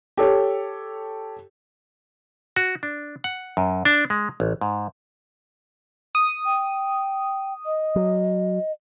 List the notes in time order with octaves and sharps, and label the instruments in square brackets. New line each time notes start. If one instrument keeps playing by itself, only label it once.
[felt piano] G4 A4 C#5
[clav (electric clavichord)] F#4
D4
F#5
F#2
D4
G#3
A1
G#2
[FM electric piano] D#6
[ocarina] G5
D#5
[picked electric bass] F#3